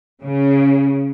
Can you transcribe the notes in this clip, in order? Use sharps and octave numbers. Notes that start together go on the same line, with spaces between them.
C#3